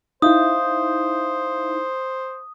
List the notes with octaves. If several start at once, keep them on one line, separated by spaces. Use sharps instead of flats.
D#4 E4 C5 E5 F5 D#6 G6